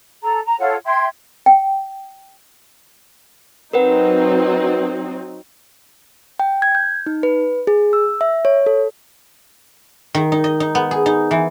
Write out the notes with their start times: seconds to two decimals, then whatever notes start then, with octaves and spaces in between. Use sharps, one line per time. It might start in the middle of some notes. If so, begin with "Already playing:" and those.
0.21 A4 A#5
0.44 A#5
0.59 F4 A4 C#5 F#5
0.85 E5 G5 C6 G#6
1.46 G5
3.73 F#3 C4 D#4 A#4 B4 F#5
6.40 G5
6.62 G#6
6.75 G6
7.06 D#4
7.23 B4
7.67 G#4
7.93 E6
8.21 E5
8.45 C#5
8.66 A4
10.15 D#3
10.32 D#4
10.44 D#5
10.60 D#4
10.75 B3
10.91 G#4
11.06 D#4
11.31 E3